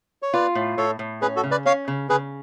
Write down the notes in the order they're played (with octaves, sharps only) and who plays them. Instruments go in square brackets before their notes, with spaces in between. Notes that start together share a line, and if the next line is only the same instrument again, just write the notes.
[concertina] C#5
[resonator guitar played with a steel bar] F4 [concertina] B4 D5
[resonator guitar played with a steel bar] A2
[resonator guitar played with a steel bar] A2 [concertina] A4 C#5
[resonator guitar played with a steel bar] A2
[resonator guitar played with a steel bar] C#4 [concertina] G#4 B4
[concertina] F#4 A4
[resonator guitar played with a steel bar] C#3
[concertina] B4 D5
[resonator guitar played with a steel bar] C#4 [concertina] C#5 F5
[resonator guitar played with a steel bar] C#3
[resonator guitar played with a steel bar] C#3 [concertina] G#4 B4